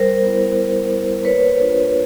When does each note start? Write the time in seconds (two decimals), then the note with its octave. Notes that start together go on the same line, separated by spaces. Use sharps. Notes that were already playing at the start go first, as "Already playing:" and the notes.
Already playing: G3 A#4 C5
0.22 B3 E4
0.57 G3
0.91 B3 E4
1.24 A#3 B4 C#5
1.59 D4 F4